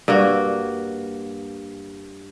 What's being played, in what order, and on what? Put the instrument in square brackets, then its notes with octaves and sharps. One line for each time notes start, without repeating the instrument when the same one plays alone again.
[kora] G2 A#3 F#4